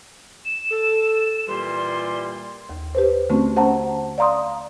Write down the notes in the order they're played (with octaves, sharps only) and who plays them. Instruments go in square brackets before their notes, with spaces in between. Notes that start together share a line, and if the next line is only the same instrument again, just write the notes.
[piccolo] E7
[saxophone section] A4
[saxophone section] A#2 E3 G3 [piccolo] C6
[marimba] D#2
G4 B4 C5
D3 A3 C4 C#4 F#4
C#4 C5 F#5 A5 A#5
D5 F5 A#5 C6 D#6